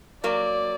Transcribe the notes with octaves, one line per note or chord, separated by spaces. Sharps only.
F#3 A#3 D5